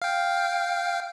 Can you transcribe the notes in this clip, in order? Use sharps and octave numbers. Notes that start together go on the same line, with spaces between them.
F5 G5